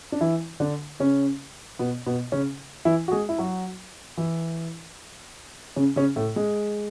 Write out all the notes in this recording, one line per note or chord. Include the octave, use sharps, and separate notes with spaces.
D4
E3 E4
D3 D4
C#3 C#4
B2 B3
B2 B3
C#3 C#4
E3 E4
F#4
G#3 G#4
E4
F#3 F#4
E3 E4
C#3 C#4
C#3 C#4
A2 A3
G#3